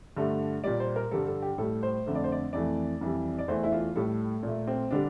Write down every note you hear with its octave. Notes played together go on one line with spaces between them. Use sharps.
G2 D3 A3
A#2 G3 D5
C5
A#4
G2 D3 G3 A4
A4
G4
A2 G3 A4
C5
F2 D3 A3
D5
C5
D5
F2 E3 A3 D5
F2 E3 G3
D5
E2 E3 A3 C5
E4
F4
A2 G3 A4
A#2 A3
C4
D3 G3 D4